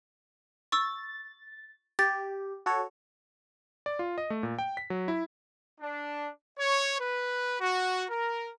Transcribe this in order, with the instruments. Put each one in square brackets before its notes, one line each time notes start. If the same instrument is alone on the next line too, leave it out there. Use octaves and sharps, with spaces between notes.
[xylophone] C#6 E6 [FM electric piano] A6
[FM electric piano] G4 [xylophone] A6
[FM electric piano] F#4 A4 C#5
[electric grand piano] D5
F4
D#5
A3
A#2
G5
B6
F#3
E4
[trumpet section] D4
C#5
B4
F#4
A#4